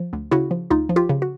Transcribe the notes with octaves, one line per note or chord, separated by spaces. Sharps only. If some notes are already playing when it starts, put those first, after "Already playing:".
Already playing: F3
D2
C#3 E4 F#4
F3
D2 D#4 F4
F3
F4 G4
C#3
F#4